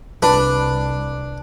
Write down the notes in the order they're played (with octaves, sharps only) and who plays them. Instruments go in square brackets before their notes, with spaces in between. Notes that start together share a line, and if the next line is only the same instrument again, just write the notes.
[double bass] C2 [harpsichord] D4 [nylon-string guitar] B4